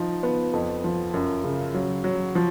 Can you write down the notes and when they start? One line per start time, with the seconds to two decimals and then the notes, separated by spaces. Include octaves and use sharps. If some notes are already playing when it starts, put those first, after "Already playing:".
Already playing: F3 D#4
0.23 B3
0.53 F2
0.84 F3
1.14 F#2
1.44 C#3
1.74 F#3
2.04 F#3
2.35 F3